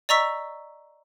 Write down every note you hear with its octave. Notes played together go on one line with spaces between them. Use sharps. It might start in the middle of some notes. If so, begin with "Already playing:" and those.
D5 D#5 A#5 C#6 E6 B6